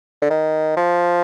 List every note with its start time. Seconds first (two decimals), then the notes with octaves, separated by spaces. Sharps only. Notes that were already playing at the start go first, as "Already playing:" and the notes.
0.22 D3
0.30 D#3
0.77 F3